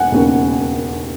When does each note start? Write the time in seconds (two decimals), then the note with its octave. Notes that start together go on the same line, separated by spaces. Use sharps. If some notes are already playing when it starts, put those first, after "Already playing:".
Already playing: E1 F#5 G#5
0.11 E1 D#2 C#3